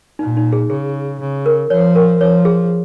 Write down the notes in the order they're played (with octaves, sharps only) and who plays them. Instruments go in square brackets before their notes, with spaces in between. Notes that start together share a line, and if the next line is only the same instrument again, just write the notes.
[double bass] A#2 [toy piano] D#4
[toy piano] D#4
G#4
[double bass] C#3 [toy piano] G#4
[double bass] C#3
[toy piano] A#4
[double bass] F3 [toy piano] C#5
[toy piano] A#4
[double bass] F3 [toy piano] C#5
[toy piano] G#4